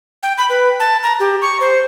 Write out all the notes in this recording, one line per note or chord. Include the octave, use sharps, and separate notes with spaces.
G5
B5
B4
A5
A#5
G4
C#6
C5